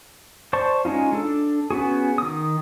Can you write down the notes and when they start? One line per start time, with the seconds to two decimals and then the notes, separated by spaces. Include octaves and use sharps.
0.53 C5 D5 A5 C6 C#6
0.85 G#3 C#4 D#4 F4
1.13 D4 A4
1.70 B3 C#4 F#4 G#4
2.18 D#3 D#6